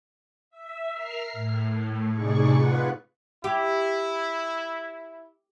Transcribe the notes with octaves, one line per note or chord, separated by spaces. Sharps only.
E5
A#4 F6 C7
A2
A2 C3 D#4 G#4 D5 C#6
F4 B4 F#5
E4 G4